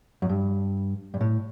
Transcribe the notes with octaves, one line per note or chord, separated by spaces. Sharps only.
F#2
G2
G2
A2